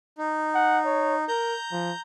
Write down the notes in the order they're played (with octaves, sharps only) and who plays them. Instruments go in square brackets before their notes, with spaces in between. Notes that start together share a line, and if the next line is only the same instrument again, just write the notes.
[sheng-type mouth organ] D#4
[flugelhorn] F#5
C#5
[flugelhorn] A#4 [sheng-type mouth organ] A#5 G6
[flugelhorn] F3